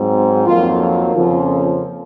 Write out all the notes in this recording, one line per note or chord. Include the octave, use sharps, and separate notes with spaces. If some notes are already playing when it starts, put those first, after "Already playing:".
Already playing: G#2 F#3 C4
F2 D#3 F#3 A#3 F4
F2 C#3 F3 A#3 C#4 F4